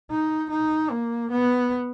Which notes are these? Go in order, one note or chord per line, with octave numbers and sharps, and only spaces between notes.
D#4
D#4
A#3
B3